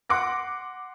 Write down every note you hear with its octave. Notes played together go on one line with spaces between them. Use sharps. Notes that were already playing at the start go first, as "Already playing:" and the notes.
F#5 C6 D6 F#6 A#6